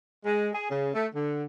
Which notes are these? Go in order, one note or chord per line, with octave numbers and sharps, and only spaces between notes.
G#3
G#4
C#3
A3
D3